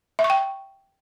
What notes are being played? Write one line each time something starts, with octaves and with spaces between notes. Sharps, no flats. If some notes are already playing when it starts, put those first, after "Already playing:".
E5
C#6
G5